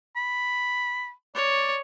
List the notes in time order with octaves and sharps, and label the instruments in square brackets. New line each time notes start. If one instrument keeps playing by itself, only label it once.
[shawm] B5
[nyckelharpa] C#5 [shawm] D5